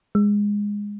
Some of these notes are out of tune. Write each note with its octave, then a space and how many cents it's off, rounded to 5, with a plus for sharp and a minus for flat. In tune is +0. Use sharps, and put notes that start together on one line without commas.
G#3 -15